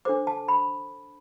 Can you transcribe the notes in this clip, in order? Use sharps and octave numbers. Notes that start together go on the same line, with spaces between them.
D4 A4 C5 D6
A5
B5